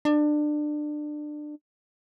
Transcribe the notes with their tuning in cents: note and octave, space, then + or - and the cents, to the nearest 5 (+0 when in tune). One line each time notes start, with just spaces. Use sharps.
D4 +25